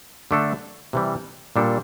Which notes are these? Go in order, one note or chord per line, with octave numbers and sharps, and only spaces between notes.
D3 A3 D4 A4
C3 E3 G3
A#2 G3 D4 A4